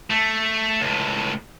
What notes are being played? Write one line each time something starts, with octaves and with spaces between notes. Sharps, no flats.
A3
C#2 A2